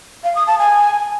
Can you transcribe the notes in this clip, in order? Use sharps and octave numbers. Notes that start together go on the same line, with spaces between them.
F5
D#6
A5
G#5